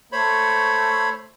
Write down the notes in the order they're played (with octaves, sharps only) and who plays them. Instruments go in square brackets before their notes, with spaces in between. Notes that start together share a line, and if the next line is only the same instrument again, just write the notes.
[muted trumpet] A3 [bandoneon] C5 C#5 B5